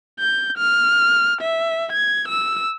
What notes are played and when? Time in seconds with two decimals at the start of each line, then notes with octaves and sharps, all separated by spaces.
0.20 G6
0.58 F6
1.42 E5
1.92 G#6
2.29 E6